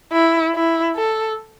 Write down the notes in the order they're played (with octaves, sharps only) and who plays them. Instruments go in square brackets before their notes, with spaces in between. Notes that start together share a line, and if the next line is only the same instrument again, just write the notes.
[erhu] E4
E4
A4